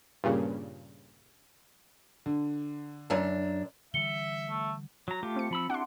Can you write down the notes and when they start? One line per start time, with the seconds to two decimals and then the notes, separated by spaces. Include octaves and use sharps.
0.24 G2 A#2 C#3
2.26 D3
3.10 F#2 D4
3.94 D3 E3 G3 E5 C#7 G7
4.50 A3
5.08 F#3 A#5
5.23 A3 F4 G4
5.36 C4 C#7
5.51 F3 B5 E6
5.70 D4 E4 G4 F#5 C6